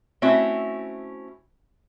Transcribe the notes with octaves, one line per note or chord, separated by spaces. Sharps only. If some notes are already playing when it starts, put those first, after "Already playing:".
A3 C4 C#4 E4 F#4 E5